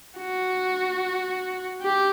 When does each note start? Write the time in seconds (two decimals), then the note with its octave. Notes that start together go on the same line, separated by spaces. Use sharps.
0.19 F#4
1.82 G4